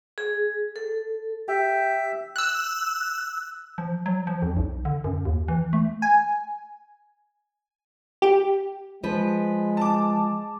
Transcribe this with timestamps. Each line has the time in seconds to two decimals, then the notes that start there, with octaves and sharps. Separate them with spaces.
0.18 G#4
0.76 A4
1.48 G4 E5
2.36 E6 F#6
3.78 F3
4.06 F#3
4.27 F3
4.42 F2
4.57 B1
4.85 D3
5.04 F#2
5.25 D#2
5.48 E3
5.73 A3
6.02 G#5
8.22 G4
9.04 F3 G#3 B4
9.77 A5 D6